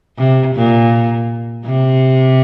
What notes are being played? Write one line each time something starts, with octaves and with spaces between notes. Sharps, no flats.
C3
A#2
C3